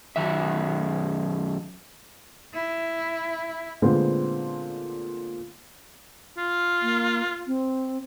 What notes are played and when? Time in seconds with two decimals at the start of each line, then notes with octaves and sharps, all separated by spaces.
0.16 F#2 D#3 E5
2.54 E4
3.82 A#2 D3 G#3 A3 B3 C4
6.37 F4
6.82 A#3
7.47 C4